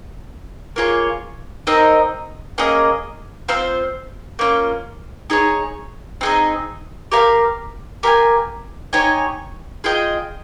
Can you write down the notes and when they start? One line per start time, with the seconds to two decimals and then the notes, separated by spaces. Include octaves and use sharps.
0.76 A#3 F4 G#4 C#5
1.67 C4 D#4 A#4 D#5
2.58 A#3 C#4 G#4 D#5
3.48 C4 F4 C5 F5
4.39 A#3 C#4 F4
5.30 D#4 G#4 C#5
6.21 C4 D#4 G#4 D#5
7.12 G4 A#4 F5
8.03 G4 A#4 F5 G#5
8.93 D#4 G4 C#5 G#5
9.84 F4 G#4 D#5 G5